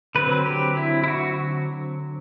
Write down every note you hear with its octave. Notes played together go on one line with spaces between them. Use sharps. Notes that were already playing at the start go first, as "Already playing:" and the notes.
D3 F#3 C4 B4
G4
E4
E4
F#4